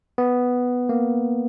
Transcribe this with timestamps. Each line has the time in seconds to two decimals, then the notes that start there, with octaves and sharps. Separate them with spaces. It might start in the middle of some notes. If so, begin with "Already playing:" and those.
0.18 B3
0.89 A#3